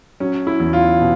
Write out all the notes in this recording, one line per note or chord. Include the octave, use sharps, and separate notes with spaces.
F#3 C#4
E4
E2
F4
B2